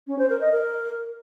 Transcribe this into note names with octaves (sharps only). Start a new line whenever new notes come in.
C#4
C5
A#4
D#5
A#4